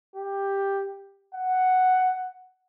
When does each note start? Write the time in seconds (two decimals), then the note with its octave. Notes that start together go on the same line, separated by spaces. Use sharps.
0.16 G4
1.35 F#5